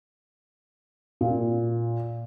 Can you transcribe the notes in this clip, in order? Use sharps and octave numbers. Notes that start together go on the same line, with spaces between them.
A#2